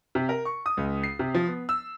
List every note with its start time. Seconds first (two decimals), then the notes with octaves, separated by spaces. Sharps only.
0.15 C3
0.29 A#4
0.45 C#6
0.66 D#6
0.77 C#2
1.04 C7
1.19 C3
1.34 F3
1.47 B3
1.69 E6